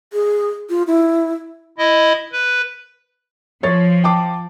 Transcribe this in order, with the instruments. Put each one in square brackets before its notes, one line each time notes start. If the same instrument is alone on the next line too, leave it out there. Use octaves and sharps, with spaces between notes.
[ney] G#4
F4
E4
[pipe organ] E4 D#5
B4
[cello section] F3 [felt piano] C#5 A6
[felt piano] G5 A5 D6